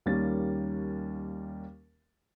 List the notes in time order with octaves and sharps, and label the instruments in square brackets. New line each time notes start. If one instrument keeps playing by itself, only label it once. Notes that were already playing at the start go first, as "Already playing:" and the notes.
[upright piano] D#2 G3 A#3 C#4 A6